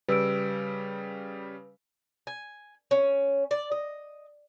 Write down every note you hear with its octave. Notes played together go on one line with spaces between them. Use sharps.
C#3 G3 B4 E6 D7
G#5
C#4
D5
D#5